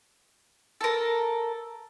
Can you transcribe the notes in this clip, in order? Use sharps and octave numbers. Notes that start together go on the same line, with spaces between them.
A4 A#4